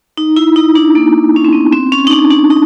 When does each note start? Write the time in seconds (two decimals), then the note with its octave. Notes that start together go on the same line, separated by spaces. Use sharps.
0.17 D#4
0.36 E4
0.56 D#4
0.75 D4
0.95 A#3
1.36 C#4
1.45 C4
1.53 B3
1.73 C4
1.92 C#4
2.07 D#4
2.11 D4
2.30 D4
2.50 D#4